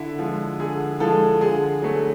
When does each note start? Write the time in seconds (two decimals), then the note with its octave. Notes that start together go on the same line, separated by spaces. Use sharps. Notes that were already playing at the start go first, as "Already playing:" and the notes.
Already playing: D3 E4
0.19 F3 G#3
0.59 D3 G#4
1.00 F3 G#3 A4
1.41 D3 G#4
1.82 F#3 A3